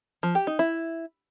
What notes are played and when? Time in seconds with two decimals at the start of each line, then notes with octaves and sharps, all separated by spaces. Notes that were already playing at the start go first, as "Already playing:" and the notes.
0.23 F3
0.35 G4
0.47 D#4
0.59 E4